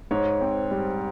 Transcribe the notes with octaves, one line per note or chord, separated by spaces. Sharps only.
G#2 C#5
C4
G3